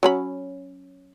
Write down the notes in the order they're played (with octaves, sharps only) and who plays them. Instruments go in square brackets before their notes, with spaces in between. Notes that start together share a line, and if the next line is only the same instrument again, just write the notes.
[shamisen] F#3 C#4 B5